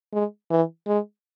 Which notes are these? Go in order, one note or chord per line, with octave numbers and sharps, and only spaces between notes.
G#3
E3
G#3